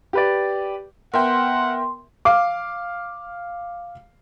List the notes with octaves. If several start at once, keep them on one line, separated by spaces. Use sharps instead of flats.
G4 B4 D5
B3 A#4 E5 F#5 G5 C6
F5 D6